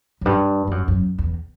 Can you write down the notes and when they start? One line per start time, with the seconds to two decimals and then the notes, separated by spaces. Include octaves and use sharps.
0.21 F#2
0.25 G2
0.67 G2
0.71 F#2
0.88 F#2
1.18 E2